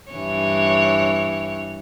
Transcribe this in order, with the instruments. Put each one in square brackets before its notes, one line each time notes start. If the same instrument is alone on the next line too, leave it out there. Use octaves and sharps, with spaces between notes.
[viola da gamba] G2 E3 C#5